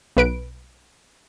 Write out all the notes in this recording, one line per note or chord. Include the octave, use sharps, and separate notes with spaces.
B1 B4 D7